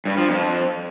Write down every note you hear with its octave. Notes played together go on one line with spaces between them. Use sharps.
G2
F3
F2